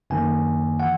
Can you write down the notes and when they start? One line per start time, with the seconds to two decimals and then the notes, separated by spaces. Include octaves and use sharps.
0.10 F#2 D#3 A#3 G#5
0.80 E3 F#5